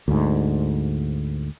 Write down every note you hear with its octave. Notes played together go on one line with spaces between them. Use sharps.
D2 G#2